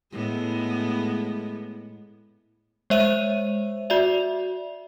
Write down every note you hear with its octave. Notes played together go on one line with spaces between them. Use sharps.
A2 G#3 B3
G#3 C5 C#5 E5 D#7
F#4 D5 E5 F7